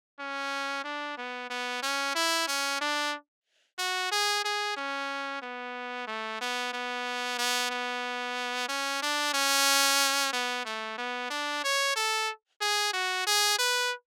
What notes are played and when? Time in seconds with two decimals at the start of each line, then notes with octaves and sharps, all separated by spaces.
0.19 C#4
0.84 D4
1.18 B3
1.50 B3
1.83 C#4
2.15 E4
2.48 C#4
2.81 D4
3.79 F#4
4.12 G#4
4.45 G#4
4.77 C#4
5.42 B3
6.07 A3
6.41 B3
6.73 B3
7.39 B3
7.70 B3
8.69 C#4
9.02 D4
9.34 C#4
10.33 B3
10.65 A3
10.98 B3
11.30 D4
11.64 C#5
11.96 A4
12.61 G#4
12.93 F#4
13.27 G#4
13.59 B4